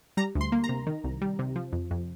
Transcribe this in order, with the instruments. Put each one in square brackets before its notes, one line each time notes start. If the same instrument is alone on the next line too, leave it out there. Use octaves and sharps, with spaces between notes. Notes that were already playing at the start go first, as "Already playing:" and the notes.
[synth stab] G3 A#5
D2
C6
A#3
A#5
C3
D#3
C2
G3
C3
F3
F2
F2